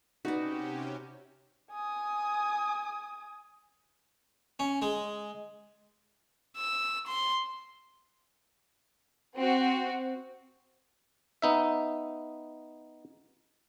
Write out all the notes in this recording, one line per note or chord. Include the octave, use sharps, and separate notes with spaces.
C3 C#4 D#4 F#4 G4 B4 D5
G#5 D#6
C#4
G#3
E6
C6
C4 F#4
B3 D#4 E5